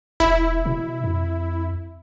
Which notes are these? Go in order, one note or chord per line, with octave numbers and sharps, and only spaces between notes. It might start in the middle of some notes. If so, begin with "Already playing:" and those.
E1 E4
B2
F2